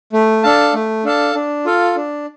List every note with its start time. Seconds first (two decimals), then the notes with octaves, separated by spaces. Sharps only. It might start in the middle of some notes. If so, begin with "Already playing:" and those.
0.13 A3
0.43 D4 A4 F5 A5
0.74 A3
1.04 D4 A4 F5 A5
1.35 D4
1.65 F4 A4 F5
1.96 D4